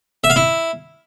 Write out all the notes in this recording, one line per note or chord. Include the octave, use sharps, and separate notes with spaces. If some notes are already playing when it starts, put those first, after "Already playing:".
E5
F5
E4